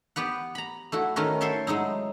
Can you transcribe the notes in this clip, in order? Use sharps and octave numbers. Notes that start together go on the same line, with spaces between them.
B3 G4 B4 F#5
A#5 B5
A3 E4 F#4
D#3 A3 C#4 A#4 B4
A4 C5 C#5 E5 G5 A5
F#3 G#3 D#4 E4